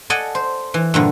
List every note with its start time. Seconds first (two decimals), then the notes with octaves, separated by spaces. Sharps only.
0.10 A4 D5 D#5 F#5 G#5
0.35 C5
0.74 E3
0.94 G2 A#2 D3